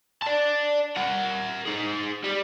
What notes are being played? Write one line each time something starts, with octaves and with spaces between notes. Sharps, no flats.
D5 A5
A#4 F#5
D#4 G#4
G3